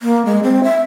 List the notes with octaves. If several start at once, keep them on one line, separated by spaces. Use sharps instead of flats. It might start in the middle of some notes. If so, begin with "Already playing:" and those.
A#3
G#3
C4
E5